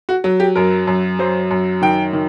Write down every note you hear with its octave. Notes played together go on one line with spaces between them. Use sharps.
F#4
F#3
G4
F#2 A#4
F#2
F#3 C5
F#2
D#3 G5
D#3